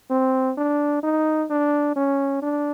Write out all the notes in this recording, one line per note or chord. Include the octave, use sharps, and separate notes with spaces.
C4
D4
D#4
D4
C#4
D4